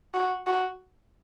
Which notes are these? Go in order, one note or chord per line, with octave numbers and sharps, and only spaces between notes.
F#4
F#4